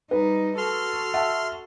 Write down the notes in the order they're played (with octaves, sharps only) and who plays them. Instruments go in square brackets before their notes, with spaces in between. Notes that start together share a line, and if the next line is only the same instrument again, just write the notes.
[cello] G3 D#4 [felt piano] B4
[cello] F#4 A4 [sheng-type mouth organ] C6 F6
[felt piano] E5 F#5 A5